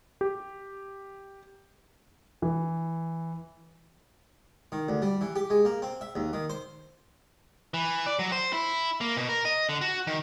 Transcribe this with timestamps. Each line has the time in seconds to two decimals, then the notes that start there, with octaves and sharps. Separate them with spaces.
0.21 G4
2.42 E3
4.72 D#3
4.89 D2
5.02 G3
5.21 E3
5.36 G4
5.50 G#3
5.65 A#3
5.82 C4
6.01 E5
6.15 D#2
6.33 D#3
6.50 C5
7.74 E3
8.06 D5
8.19 F#3
8.32 C5
8.53 E4
9.01 A#3
9.17 B2
9.29 A#4
9.45 D#5
9.69 D3
9.81 F#4
10.07 D#3